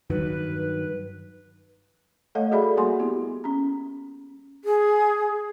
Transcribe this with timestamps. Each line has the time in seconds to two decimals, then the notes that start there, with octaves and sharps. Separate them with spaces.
0.10 G2 D#3 F#3 B4
2.35 A3 A4 C#5 D#5 F5 F#5
2.51 F#4 G#4 A4 D5 E5 B5
2.77 G3 A#3 F#4 F#5 G#5 C6
3.00 B3 E4 G4
3.44 C#4 A#5
4.65 G#4